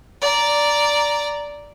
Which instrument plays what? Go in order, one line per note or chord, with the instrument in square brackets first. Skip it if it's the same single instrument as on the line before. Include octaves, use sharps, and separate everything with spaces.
[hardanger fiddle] D5 A#5